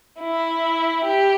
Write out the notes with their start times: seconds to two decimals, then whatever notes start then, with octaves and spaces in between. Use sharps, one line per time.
0.20 E4
1.05 G4